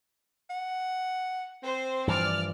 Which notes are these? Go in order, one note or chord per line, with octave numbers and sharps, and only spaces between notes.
F#5
C4 C5
G2 E3 F3 D5 F6